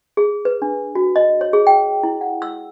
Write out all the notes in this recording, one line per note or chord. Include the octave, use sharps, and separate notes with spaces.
G#4
B4
D4
F#4
D#5
C#5
G#4
G5
E4
F#5
E6